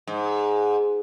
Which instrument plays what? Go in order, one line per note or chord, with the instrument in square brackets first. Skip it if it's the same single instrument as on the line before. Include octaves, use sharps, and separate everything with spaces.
[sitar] G#2